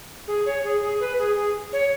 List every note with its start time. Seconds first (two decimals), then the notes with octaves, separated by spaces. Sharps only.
0.28 G#4
0.46 C#5
0.64 G#4
0.82 G#4
1.00 B4
1.19 G#4
1.36 G#4
1.73 C#5